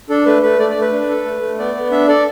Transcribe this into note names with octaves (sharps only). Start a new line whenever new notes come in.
D4 A4
A3 B4
A3 B4
A3 D5
D5
A3
B4
D4
A4
A3
A3
B3 D5
B3
D4 E5
A4 D5